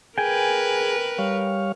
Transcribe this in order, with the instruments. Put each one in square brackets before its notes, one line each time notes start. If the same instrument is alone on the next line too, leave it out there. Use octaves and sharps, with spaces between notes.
[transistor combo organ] G#4 [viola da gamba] A#4 B4 [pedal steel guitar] G5 G#5
[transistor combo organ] G3 C#5 F5